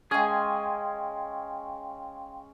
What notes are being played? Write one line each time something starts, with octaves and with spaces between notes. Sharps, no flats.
G#3 C#4 G#4 F5 G5 G#5 C6